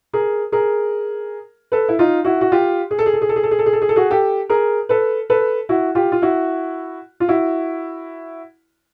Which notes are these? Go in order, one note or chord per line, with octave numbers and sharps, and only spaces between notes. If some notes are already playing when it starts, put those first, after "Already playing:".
G#4 A#4
G#4 A#4
A4 B4
E4
D#4 F4
E4 F#4
F#4
F4 G4
G#4
A4
G#4
A4
G#4
A4
G#4
A4
G#4
A4
G#4
A4
G#4
A4
F#4 G#4
G4 A4
G#4 A#4
A4 B4
A4 B4
E4 F#4
F4 G4
F4
E4 F#4
F4
E4 F#4